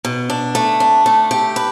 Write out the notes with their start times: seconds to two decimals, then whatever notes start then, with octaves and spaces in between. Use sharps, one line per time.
0.05 B2
0.30 D4
0.55 A3
0.80 D4
1.06 A3
1.31 G4
1.56 B4